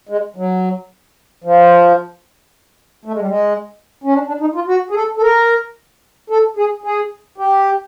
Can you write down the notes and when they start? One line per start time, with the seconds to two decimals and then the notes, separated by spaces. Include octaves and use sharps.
0.09 G#3
0.36 F#3
1.44 F3
3.05 A3
3.13 G#3
3.20 G3
3.27 G#3
4.04 C#4
4.14 D4
4.28 D4
4.41 D#4
4.55 F4
4.68 F#4
4.90 G#4
4.95 A4
5.17 A4
5.22 A#4
6.30 A4
6.57 G#4
6.84 G#4
7.38 G4